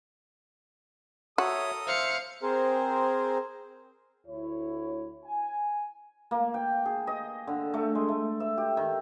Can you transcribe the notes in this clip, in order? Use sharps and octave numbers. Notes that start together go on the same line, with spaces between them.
F#4 A4 A#4 C#5 E5 D#6
C5 E5 F5 C#7
C4 G#4 A#4 C5
D2 E4 C#5
G#5
A#3
G5
G#4
D#5
D3
A3
G#3
A3
E5
G4
D#3